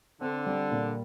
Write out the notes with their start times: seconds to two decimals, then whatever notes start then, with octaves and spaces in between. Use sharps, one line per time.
0.21 D3 C4
0.47 G3
0.71 A#2